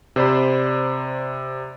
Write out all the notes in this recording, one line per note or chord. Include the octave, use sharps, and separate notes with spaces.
C3 C5 D5 B5